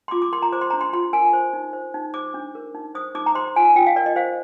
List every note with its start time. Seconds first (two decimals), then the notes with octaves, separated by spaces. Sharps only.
0.08 C6
0.11 F4 D6
0.22 D6
0.32 A#4 C6
0.42 A#5
0.52 C5 D6
0.61 C6
0.70 D4 A#5
0.81 C6
0.93 F4 C6
1.13 A#4 G#5
1.33 C5
1.53 D#4
1.73 C5
1.94 D#4
2.14 C5 D6
2.34 D4
2.55 A#4
2.75 D#4
2.95 C5 D#6
3.15 D#4 D6
3.26 A#5
3.35 C5 C6
3.56 F4 G#5
3.76 F4 G5
3.87 F5
3.96 A#4 D5
4.06 D#5
4.16 C5 F5